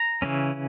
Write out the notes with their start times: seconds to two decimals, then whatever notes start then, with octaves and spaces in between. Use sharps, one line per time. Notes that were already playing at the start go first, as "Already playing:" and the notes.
Already playing: A#5
0.22 C#3 E3 A#3 C#4